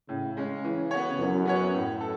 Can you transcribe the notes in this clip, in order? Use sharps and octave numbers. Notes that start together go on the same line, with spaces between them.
A2 C#3
G#3 C#4
E3
B3 F#4 C#5
F#2 E3
B3 F#4 C#5
A2
A4